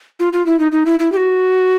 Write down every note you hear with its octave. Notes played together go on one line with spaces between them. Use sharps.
F4
F4
E4
D#4
D#4
E4
E4
G4
F#4